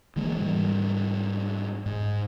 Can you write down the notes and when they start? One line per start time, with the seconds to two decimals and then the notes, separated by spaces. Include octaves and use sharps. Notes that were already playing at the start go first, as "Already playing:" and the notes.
0.16 D3 E3 G#3 A#3
0.38 G#2 E3 G3
1.86 G#2